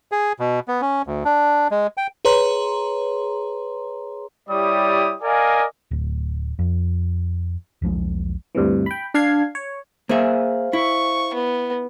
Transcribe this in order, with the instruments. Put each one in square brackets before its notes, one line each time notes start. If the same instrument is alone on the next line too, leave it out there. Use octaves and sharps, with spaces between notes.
[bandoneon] G#4
B2
B3
C#4
D2
D4
G#3
G5
[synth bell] G#4 B4 C#5 A#5 C6
[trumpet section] G3 E4 G4 C#5 D5 D#6
A#4 D5 D#5 F5 G#5
[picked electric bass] D1
F2
E1 B1 F3 G#3
[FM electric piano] D2 G2 C3 E3
G5 B5
D4 F5 G#6 C7
C#5
[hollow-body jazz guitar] A#3 G#4 E5 [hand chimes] C5 F5
[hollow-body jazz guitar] E4 [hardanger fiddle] C#6
[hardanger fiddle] B3